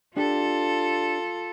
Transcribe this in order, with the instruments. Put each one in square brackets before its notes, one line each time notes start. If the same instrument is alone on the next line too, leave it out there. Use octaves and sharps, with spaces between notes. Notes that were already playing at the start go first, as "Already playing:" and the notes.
[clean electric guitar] D4 G4 [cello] F4 A4